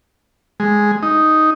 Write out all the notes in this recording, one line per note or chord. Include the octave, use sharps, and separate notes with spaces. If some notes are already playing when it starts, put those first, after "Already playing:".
G#3
D#4